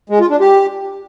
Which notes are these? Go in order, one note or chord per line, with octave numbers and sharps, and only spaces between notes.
G#3
F4
D4
G4